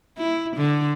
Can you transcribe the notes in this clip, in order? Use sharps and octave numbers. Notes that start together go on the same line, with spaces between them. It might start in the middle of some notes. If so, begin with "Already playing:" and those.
E4
D3